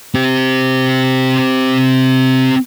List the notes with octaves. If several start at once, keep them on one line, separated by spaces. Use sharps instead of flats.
C4 G4